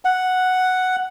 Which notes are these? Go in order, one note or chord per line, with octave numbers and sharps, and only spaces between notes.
F#5